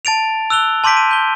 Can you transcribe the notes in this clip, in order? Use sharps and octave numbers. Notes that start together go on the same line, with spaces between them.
A5 A6 D7 F7
E6 F#6 F7 G7
A5 C6 D6 G6 B6 D7
D#7
G6 G7